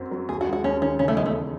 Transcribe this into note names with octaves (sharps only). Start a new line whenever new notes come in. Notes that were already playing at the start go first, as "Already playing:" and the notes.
Already playing: F#2 F#3 C4
F#3
D#2 G#4
F#4
G#3
F#4
D#2 C#4
D#3 C#4
C#3 C#4
A3
E2 G#3
A3